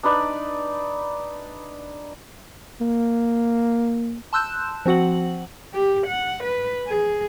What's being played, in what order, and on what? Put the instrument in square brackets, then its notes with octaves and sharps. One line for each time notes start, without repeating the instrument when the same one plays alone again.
[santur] D4 D#4 B4 D5
[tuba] A#3
[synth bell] A5 C6 E6 F#6 G6 E7
F3 C4 F#4 F#5 F#7
[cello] G4
F#5
B4
G#4